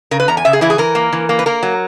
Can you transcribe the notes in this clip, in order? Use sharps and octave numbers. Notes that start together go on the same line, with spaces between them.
C#3 A#4
B4
E2 A#5
G#5
C#3 E5
G#4
E3 E4
G#4
E3 A#4
A#3
E3
A#3
B4
A#3 A#4
F#3